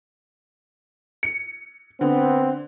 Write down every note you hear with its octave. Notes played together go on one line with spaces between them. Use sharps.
C#7
D3 B3 C4